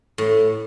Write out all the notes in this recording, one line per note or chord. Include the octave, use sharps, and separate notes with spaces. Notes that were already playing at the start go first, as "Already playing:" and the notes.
A2